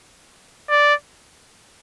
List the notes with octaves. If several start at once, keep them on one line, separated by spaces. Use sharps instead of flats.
D5